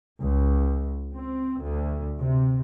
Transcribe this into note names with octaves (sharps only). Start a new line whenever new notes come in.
C#2
C4
D2
C3